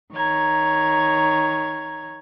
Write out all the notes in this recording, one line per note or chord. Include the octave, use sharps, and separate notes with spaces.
D#3 C#5 A#5 G#6